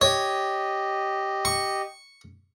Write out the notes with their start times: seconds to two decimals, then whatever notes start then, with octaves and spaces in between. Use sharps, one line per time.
0.01 G4 C#5 D#5
1.45 C#6